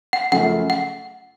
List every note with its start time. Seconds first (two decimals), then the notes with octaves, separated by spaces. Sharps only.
0.13 F#5
0.32 F#2 C#3 F3 A3 F#5
0.70 F#5